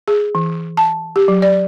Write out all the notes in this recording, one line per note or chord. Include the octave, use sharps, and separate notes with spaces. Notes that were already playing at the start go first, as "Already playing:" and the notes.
G#4
E3
A5
G4
F#3
D5